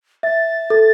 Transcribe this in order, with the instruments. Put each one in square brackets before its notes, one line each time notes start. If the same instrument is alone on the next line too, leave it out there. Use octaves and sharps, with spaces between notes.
[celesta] E5 [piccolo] A6
[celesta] A4